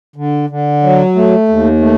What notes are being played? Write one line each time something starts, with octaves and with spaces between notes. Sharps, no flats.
D3
D3
F#3
A3
D#2
A3